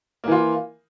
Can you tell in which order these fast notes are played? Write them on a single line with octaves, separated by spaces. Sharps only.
A#3 E3 F4